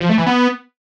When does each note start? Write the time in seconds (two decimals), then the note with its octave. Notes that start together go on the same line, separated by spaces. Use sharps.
0.01 F3
0.09 A3
0.18 E3
0.26 B3